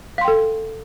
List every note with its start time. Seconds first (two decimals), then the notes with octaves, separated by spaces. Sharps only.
0.18 F5
0.21 C6
0.25 G5
0.28 A4